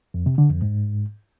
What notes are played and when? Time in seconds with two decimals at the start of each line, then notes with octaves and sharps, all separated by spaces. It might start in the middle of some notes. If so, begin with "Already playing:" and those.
0.14 F2
0.26 C3
0.38 D3
0.50 F2
0.62 G#2